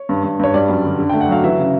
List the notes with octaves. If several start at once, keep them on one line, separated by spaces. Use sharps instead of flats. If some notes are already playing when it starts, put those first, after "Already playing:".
Already playing: C#5
G2
G2
G2 C#5
G3 D5
F#2
D3
D3
A3 G5
F#5
F#3 F5
E3 E5
C#3